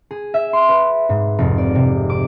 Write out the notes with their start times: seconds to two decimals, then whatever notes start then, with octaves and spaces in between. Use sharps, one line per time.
0.11 G#4
0.34 E5
0.53 C6
0.69 B4
1.09 G#2
1.38 F1
1.58 D5
1.75 C3
2.10 D6